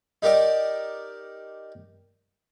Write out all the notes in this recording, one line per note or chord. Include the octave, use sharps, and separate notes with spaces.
D#4 G4 A#4 D5 D#5